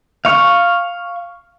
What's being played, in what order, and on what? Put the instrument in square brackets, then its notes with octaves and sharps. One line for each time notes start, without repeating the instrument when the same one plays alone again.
[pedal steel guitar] F5 C#6